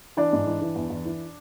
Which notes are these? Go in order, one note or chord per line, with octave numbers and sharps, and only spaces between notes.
E3 D4 D5
G#2
E3
E3
E2
E2
E3